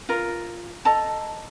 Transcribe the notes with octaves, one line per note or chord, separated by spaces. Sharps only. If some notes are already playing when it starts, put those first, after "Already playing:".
F4 A#4
A4 D#5 A5 A#5